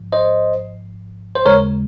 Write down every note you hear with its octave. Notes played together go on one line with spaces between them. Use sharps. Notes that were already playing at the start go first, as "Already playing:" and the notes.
Already playing: G#1 G#2 F3
C5 D#5
C5
D#2 C#3 G#3 A#4 C#5